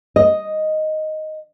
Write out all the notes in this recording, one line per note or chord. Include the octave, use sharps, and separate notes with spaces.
D#5